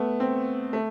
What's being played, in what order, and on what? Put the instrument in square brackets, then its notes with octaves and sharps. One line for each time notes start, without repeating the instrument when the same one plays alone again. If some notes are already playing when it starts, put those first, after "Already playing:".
Already playing: [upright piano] A3 B3
C4
A3